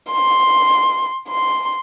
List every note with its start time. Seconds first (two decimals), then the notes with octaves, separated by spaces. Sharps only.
0.11 C6
1.29 C6